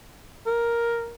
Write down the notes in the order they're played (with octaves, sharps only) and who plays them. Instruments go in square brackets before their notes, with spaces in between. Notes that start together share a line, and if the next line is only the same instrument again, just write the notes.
[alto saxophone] A#4